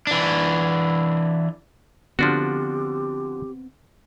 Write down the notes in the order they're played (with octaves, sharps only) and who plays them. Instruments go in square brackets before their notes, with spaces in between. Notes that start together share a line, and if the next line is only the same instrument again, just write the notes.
[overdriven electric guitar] E3 D4
[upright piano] D3 [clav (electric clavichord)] F3 D4 F#4 [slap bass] B3 C4 [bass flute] G4